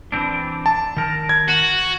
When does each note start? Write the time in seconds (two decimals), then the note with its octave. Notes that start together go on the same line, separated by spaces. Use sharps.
0.12 E3 C4 D4
0.66 A5
0.97 D#3 A#4
1.29 G#6
1.49 F#4